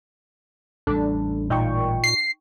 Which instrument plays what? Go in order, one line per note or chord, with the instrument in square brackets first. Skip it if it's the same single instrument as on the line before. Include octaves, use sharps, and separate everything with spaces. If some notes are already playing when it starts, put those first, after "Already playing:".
[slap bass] A1 G3 [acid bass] D4 [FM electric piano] A4
[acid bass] A#2 [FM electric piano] D#4 G5 C#6
[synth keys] C7